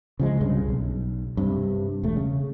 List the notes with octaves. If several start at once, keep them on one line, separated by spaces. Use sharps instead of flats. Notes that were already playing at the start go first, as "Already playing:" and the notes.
C#3 F3 G#3
C2 G2 C#3
B1
G2 C3
E1 A3
C#3